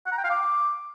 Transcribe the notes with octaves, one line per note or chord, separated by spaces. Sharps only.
F#5
A#5
G5
F5
D6